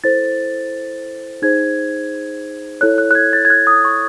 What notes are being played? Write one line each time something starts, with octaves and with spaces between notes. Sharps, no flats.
E4 A4 C5 A6
D#4 G#4 C5 G#6
E4 A4 C#5 F#6
F#6
F#6
G#6
A6
G#6
F#6
D#6
C#6